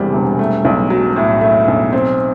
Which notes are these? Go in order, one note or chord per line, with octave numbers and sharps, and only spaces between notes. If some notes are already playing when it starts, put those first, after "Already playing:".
Already playing: E1 E2 C3 G3
E1
A3
B1
F#3
A2
A3
B1
C4